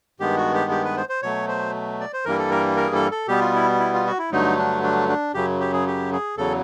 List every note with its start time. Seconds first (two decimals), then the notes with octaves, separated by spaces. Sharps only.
0.20 G2 D#3 G#3 B3 G4
0.37 F#4
0.54 G4
0.71 G4
0.84 B4
0.97 C5
1.09 C5
1.22 B2 F#3 A3 C#5
1.48 C5
2.00 D5
2.13 C5
2.25 G2 E3 G3 A#3 A#4
2.39 A4
2.51 A#4
2.77 A#4
2.87 G#4
2.95 A4
3.11 A4
3.28 B2 G3 B3 G4
3.41 F4
3.55 E4
3.80 E4
3.93 F4
4.07 F#4
4.19 E4
4.32 G2 D3 F#3 A3 D#4
4.58 D4
4.83 D4
5.09 D4
5.34 F#2 C#3 F#3 G4
5.60 G4
5.73 G#4
5.87 G4
6.12 G#4
6.37 E2 C#3 F#3 A4